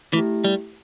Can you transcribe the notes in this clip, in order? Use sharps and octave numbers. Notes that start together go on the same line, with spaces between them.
E3 A3 E4 G4
G3